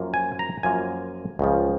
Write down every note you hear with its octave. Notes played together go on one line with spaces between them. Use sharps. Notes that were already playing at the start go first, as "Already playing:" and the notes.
Already playing: F#2 F3 A#3 F4
G#5
A#5
F#2 F3 A#3 F4 G#5
C#2 C#3 F3